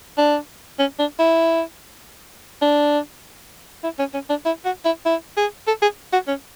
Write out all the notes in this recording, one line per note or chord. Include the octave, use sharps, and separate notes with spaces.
D4
C#4
D4
E4
D4
E4
C#4
C#4
D4
E4
F#4
E4
E4
G#4
A4
G#4
F#4
C#4